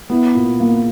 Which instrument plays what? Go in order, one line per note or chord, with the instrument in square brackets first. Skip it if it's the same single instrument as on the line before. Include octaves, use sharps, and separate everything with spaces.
[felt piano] B3 [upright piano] E4
[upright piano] A#2
A#3